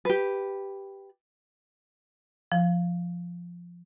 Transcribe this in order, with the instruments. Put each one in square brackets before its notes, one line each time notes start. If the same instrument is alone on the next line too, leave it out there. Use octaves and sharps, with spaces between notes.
[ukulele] G4 B4
[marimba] F3